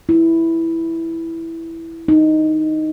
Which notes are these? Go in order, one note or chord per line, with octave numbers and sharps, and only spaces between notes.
E4
D#4